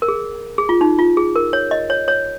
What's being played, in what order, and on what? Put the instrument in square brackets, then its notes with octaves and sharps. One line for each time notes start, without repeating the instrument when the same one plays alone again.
[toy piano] A#4
G#4
G#4
F4
D#4
F4
G#4
A#4
C#5
D#5
C#5
C#5